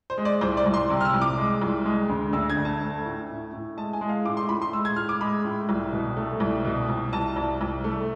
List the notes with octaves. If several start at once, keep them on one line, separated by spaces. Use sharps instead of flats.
C5
G#3
D5
C2 C5
D5
C2
C6
C3
F6
E6
C2
D6
G#3
C2
G#3
D2
D2 E6
G#6
D2
A5
A3
A2
A2
A2
G#3 A5
G#5
G#3
F5
A2 D6
C6
A2 B5
C6
G#3 E6
G#6
A2 F6
D6
G#3 B5
A2
C2
B2
A3
C2
B2
C2
C2 A5
C2
C2
A3